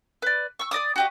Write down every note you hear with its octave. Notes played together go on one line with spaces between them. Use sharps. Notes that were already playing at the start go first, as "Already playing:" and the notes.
B4 D5
C#6 E6
D5 D#5 D6 D#6
F#4 G4 D#5